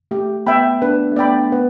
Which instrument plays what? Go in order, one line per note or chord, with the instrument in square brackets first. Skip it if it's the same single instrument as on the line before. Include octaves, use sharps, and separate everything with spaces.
[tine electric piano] A3 [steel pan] G4
[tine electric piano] B3 [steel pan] E5 G5 B5
[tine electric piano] D4 [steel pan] B4
[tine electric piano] A3
[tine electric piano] B3 [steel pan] D5 G5 B5
[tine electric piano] B3 [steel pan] B4